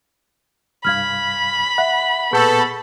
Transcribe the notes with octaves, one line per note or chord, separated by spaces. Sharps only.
C2 G2 F5 B5 F6 G#6
E5 F#5
A#2 B3 G#4 A4 C#6 G6